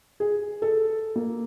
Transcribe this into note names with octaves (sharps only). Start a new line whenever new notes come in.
G#4
A4
A#3